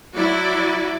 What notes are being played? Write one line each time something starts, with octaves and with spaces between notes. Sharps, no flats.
F#3 E4 F#4 D5